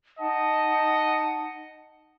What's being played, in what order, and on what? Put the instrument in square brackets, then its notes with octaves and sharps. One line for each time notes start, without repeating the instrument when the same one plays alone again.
[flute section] D#4 F#5 A5 [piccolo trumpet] D#5